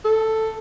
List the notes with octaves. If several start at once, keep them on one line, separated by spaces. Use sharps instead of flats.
A4